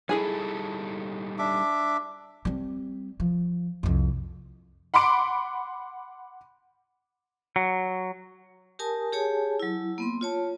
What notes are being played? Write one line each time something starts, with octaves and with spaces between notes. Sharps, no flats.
G3 D#4 E4 G#4 A4 G#5
D4 E5 D6
G3 C4
F3
C2 F2
F#5 B5 C6 D6 D7
F#3
G4 A#4 G#5 A5 D#6
G4 G#4 C#5 G#5 A5
F#3 E4
A#3 B3 C6
F4 C#5 A5